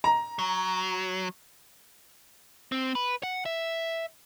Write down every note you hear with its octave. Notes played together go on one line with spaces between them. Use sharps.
A#5
F#3
C4
B4
F#5
E5